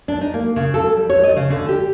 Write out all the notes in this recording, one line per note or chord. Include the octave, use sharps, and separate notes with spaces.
D4
D#4
A#3
C#3
A4
G3
C#5
D#5
C#3
D3
G4